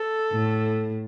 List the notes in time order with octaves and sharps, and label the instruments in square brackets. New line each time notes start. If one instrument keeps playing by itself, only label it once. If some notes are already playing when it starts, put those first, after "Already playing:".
Already playing: [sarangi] A4
[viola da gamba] A2